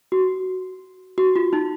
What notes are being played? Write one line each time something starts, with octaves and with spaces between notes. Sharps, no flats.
F#4
F#4
F4
D#4